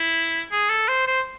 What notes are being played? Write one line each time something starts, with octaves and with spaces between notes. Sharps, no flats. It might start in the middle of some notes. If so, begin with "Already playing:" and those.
Already playing: E4
G#4
A4
C5
C5